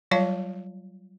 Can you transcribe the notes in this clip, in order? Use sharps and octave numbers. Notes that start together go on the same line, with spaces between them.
F#3 G3 F4 C#5 F5 A5